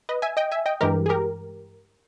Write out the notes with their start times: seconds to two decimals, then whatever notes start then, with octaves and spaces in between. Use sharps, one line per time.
0.09 B4 D#5
0.22 E5 G#5
0.37 D#5 G5
0.52 E5 G#5
0.66 D#5 G5
0.81 G2 E3 G#3 G4 A#4
1.06 G#4
1.09 G4 A#4